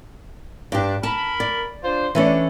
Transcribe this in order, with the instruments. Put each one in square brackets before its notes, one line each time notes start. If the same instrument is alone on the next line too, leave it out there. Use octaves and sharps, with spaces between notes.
[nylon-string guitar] G2 G4 [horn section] D4
[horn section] A#4 B5 [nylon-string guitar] A5
[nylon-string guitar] D5
[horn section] D4 F4 C5
[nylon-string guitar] E3 A3 C#4 [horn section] D4